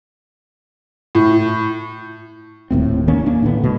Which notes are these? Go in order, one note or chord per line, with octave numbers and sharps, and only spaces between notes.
A2
D#1 D#2 A2 C4
D#3 A#3 C#4 D4
A#3 D4
A2 D3 B3
B2 G#3